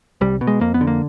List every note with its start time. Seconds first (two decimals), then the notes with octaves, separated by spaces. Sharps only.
0.21 C2 G3
0.41 B2
0.47 G#3
0.61 F2 A#3
0.74 B3
0.81 D3
0.87 A#3